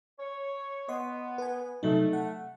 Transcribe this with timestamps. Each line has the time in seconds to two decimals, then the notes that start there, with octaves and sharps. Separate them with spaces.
0.19 C#5
0.89 B3 D#5 C6
1.38 B4 G#5
1.83 C3 F#3 A3 D#4
2.13 F#5